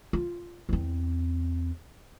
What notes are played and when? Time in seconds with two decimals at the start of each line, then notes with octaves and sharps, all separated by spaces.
0.13 F4
0.69 E2 C4